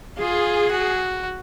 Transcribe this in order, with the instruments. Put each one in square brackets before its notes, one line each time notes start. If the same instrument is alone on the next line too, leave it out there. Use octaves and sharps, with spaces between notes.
[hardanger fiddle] F4 [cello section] G#4
[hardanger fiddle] F#4